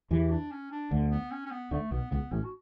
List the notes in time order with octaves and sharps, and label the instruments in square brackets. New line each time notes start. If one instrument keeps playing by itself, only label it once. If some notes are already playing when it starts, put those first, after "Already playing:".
[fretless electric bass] E2 E3 [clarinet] G4
[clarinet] D4
C#4
D4
[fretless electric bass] D2 D3
[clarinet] B3
C#4
C#4
B3
[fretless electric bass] D2 D3 [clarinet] A3
[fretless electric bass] B1 B2 [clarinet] B3
[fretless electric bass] C#2 C#3 [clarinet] B3
[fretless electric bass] A1 A2 [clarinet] C#4
[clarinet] F#4